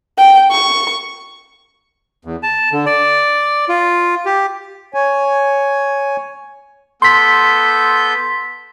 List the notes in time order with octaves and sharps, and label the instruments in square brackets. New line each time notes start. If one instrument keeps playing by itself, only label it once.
[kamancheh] G5
C#6
[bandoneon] E2
A5
D3
D5
F4
G4
[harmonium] C#5 G#5
[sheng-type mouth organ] B3 A4 G6 [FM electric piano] C6 B6